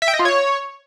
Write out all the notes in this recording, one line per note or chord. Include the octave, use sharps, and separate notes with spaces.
E5
G5
D#5
F4
C#5